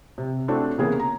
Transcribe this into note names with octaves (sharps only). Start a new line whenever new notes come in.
C3
A3 C4 D4 E4 F#4 A4
C#3 E3 A#3 B3 G#4 A#4
A#5